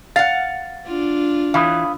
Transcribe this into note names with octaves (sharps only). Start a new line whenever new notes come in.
F5 F#5 A6
D4 F4
E3 F5 B5 D#6